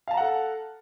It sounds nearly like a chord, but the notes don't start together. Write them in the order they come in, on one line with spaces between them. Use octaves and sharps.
F5 A5 A#5 F#5 A4